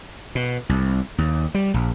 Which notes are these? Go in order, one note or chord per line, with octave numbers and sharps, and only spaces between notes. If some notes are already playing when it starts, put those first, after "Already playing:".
B2
C2
D#2
G3
A#1